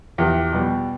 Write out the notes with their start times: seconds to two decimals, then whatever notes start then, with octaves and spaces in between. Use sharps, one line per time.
0.18 E2 G4
0.53 B2 G3